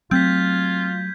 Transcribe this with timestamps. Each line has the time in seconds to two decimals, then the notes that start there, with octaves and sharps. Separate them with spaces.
0.11 F#3 A3 C4 F4 G6 G#6 B6